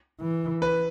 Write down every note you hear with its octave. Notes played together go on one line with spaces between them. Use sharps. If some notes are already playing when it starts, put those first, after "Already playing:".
E3
B4